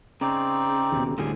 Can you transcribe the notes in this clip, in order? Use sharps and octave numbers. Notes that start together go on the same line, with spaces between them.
C#3 C4 D#4 D5
D#2 B2
D2 A2 D3 G3 G#4